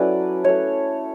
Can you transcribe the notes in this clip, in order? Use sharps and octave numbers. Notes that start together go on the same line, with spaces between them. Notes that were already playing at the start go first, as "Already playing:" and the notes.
Already playing: F#3 C#4 E4 A4 B4 D5
A3 E4 C#5